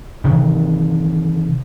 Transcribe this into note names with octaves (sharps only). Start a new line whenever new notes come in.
C3 D#3 E3